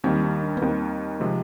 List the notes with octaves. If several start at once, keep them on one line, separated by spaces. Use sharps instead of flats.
D#2 D#3 G3 C4
D#4
D4
B3
D#2 D#3 G3 C4
C3 F3 G#3